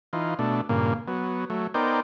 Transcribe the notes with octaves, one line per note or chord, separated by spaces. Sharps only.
E3 D#4 F4
B2 A3 D4
G2 A#2 C#3 A#3
F#3 B3
F#3 A3
B3 D#4 A#4 C5 D5 G5